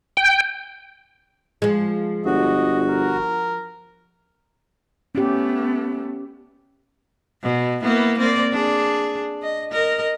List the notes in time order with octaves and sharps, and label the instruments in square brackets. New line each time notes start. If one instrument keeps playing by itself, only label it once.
[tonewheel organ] G5
[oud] F3 G#3
[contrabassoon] G1 [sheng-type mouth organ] F#4 [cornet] D#5
[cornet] A#4
[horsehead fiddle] A3 B3 [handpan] C#4 G4
[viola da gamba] B2
A#3 B3 E4
A#3 C4 D5
D4 G#4
D#5
A#4 D#5